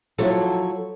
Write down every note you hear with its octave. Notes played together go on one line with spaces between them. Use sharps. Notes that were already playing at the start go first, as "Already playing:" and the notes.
F3 F#3 E4 A4 C#5